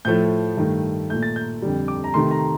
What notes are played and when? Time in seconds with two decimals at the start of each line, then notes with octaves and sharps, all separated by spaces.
0.05 A2 F3 A3 G6
0.57 G2 D#3 A3
1.10 A#2 A3 G6
1.23 A6
1.36 G6
1.62 F2 D3 G3
1.88 D6
2.04 A#5
2.14 C3 D#3 A3 C6
2.31 A#5